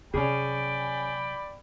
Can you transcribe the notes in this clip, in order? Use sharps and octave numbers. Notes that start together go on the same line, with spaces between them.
C3 F#3 C#4 G#4 D5 G5 B5